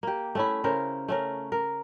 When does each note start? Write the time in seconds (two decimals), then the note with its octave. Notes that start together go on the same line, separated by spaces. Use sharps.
0.03 A#3 G4
0.35 A3 C#4 E4
0.64 C#3 C#4 A#4 C5
1.08 A3 C#4 A#4
1.52 A#4